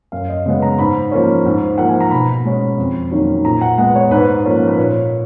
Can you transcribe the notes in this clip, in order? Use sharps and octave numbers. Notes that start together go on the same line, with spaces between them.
F#2 F5
D#5
C#3 G#3 B3
A#5
G#2 B5
F3 A#3 C#4
G#2
F3 A#3 F#5
G#5
A#5
B2 B5
G#3 C#4
F2
D#3 F#3 A#3 C#4
A#2 A#5
F#5
G#3 B3 F#5
C#5
G#2 B4
F3 A#3 C#4
B4
A#2 C#5